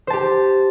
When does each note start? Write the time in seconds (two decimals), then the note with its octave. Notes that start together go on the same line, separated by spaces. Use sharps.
0.07 C5
0.10 A5
0.13 G4